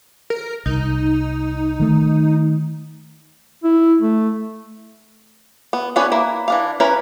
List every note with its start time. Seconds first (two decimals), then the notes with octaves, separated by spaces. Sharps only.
0.30 A#4
0.66 C2 D#4
1.80 D#3 A3
3.64 E4
4.01 A3
5.73 B3
5.96 B3 C#4 D4 G#4 B4
6.12 A#3 E4
6.48 E3 D4 F5
6.80 E3 C#4 E4 A#4 B4